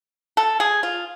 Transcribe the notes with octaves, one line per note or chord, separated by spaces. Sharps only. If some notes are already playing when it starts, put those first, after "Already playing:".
A4
G#4
F4